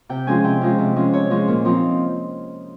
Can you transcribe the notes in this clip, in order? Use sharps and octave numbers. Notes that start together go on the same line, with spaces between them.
C3 G5
F3 G#3 C#4 G#5
C3 G5
F3 G#3 C#4
C3
F3 G#3 C#4
C3 C#5
F3 G#3 C#4
A#2
F3 C4 D#4